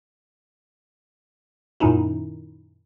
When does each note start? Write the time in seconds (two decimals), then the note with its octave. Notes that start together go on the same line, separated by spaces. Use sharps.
1.80 F#2 A#2 D#3 C#4 D#4 E4